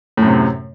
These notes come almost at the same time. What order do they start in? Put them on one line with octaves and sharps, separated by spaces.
A2 F#2 C3